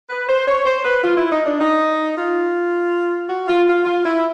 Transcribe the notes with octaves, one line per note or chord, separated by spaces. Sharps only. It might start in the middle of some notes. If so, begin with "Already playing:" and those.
B4
C5
C#5
C5
B4
F4
E4
D#4
D4
D#4
F4
F#4
F4
F4
F4
E4